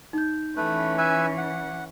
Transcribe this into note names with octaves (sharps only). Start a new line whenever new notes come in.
D#4 G6
E3 A3 C#4 B4
B4 E5 G#5
F#5